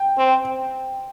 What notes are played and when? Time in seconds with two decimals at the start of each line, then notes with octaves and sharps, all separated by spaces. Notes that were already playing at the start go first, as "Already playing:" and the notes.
Already playing: G5
0.18 C4